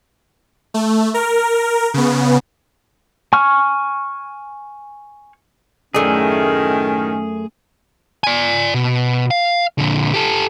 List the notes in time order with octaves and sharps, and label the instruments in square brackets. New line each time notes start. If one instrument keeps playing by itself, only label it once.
[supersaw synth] A3
A#4
C#3 B3
[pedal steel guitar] G#5 C#6 F6
[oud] F#2 A3 D5 [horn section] A2 D#3 [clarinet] C#4 [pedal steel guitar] G#4
[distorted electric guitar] D5 G#5
B2
F5
A#2 D3
G4 A4